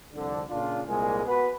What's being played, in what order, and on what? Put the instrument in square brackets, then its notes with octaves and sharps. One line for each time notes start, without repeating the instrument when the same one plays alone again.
[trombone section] C2 F2 D3
A#2 C#3 D4 F4
C2 A#2 G#3 G#4 A#4
B3 F#4 B4